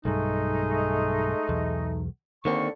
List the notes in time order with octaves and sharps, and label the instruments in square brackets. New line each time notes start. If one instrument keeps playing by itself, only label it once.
[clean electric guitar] B1 G2 [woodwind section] G#3 A3 D#4
[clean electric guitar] B1 E2
[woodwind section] D#2 D3 C#6 [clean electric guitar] D#3 A#3 C4